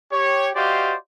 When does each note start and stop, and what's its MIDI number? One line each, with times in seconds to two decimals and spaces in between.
0.12 0.50 67
0.12 0.50 73
0.56 0.95 66
0.56 0.95 67
0.56 0.95 72
0.56 0.95 74
0.56 0.95 75
0.56 0.95 77